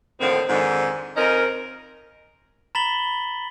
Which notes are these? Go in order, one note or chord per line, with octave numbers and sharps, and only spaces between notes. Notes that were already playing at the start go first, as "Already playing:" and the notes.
A2 D3 D#3 F3 A#3 C4
F2 G#2 D3 D#3
F2 C4 C#4 D#4 A#4 D#5
A#5 B5 A6 B6 F#7 G7